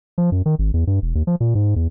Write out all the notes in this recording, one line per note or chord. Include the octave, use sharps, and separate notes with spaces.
F3
F#2
D#3
G#1
E2
G2
E1
D#2
F3
A#2
G#2
E2